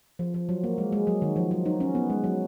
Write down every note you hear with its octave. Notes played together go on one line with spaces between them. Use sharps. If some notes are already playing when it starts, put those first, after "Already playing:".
F3
F3
F#3
A#3
G#3
G#3
F#3
D#3
F3
F#3
D#4
C#4
B3
G#3
F#3